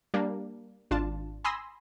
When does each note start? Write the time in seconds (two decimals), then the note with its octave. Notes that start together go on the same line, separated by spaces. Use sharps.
0.14 G3 A#3 D4
0.91 G#1 D4 F4 A5
1.44 G#5 B5 C6 D#6 E6 A#6